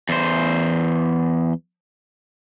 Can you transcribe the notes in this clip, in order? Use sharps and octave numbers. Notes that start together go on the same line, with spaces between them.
E2 C5